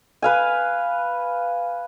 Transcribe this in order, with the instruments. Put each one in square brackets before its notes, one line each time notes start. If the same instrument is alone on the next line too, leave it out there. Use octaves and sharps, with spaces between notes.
[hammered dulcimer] B4 F5 G#5